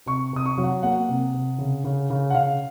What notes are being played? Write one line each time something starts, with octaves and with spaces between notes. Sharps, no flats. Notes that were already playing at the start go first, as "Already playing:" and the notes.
C3 C#6
C3 D#6
C#6
F#3
F#5
A#3 F#5
C3
C3
C#3
C#3
C#3
F#5
C#3 F5